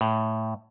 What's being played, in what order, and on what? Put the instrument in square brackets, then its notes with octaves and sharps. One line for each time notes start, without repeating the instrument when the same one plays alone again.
[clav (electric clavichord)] A2